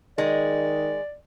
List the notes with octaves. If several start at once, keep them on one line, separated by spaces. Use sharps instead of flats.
D#3 G#3 D5